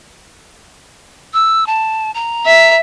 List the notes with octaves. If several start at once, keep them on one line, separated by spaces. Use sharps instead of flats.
E6
A5
A#5
E5